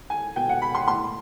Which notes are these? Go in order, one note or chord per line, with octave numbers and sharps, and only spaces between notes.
G#5
B2 G5
F#5
B5
C6
A2 C6